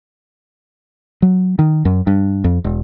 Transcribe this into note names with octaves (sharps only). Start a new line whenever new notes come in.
F#3
D#3
F#2
G2
F2
E1